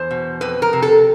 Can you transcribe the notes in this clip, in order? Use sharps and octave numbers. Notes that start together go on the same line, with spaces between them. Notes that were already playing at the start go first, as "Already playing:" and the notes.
Already playing: E2 C5
B2
F2 B4
A#4
C3
A4